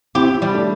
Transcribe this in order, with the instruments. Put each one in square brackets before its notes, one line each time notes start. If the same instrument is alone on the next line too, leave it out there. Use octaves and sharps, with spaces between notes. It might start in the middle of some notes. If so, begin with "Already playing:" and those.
[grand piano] C4 E4 [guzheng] G4
[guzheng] G3
[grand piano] A3 D4